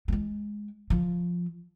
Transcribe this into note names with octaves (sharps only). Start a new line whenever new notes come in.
A3
G#3
F3